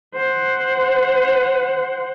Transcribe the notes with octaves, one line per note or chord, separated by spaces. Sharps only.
C5 F#5